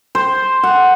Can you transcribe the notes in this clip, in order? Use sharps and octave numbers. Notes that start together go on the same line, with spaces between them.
C5
F#5